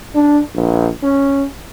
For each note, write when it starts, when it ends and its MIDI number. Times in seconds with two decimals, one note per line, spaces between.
0.14 0.39 62
0.54 0.89 34
1.03 1.44 61